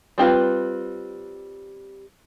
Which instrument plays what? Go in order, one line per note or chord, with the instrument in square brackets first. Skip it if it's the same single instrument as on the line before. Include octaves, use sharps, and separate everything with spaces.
[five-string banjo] G3 C4 F4 B4